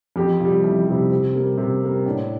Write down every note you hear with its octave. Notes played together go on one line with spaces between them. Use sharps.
F2 G4
C3 F4
G3
F2 E4
C3 G3
C3
G3 A#3
C3
G3 A#3
A2 D4